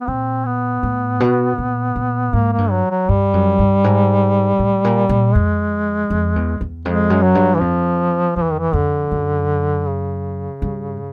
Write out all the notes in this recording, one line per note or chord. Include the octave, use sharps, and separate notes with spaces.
B3
A#2 C4
B3
A2
B2
A#2
A#2
G#2 A#3
A#3
G2
F#3
F#3
G2 G3
F#2
G2
G#2
A2
A#2
A#2
F2 G#3
F2
E2
E2
F2 G#3
F#2
F#3
G2
E3
F2 F3
F2 F3
E3
D#3
E3
F2 D3
F#2
C#3
G2